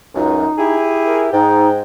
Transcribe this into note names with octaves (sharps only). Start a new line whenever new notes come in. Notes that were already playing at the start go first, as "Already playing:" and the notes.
C#2 F#2 D#4
E4 G4 G#4
A#4
G#2 D#4 G5